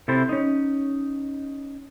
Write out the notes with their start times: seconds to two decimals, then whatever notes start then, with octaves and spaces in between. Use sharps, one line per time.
0.08 C3 E4 A4 C5
0.29 C#4 D#4